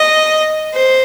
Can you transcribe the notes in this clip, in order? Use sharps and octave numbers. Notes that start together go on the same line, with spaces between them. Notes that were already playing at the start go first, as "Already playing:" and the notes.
Already playing: D#5
C5